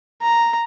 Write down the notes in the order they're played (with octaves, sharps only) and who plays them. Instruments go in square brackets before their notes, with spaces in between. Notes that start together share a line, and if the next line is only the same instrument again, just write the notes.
[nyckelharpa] A#5